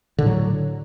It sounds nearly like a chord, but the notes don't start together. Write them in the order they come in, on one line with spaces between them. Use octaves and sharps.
D3 A2 F#3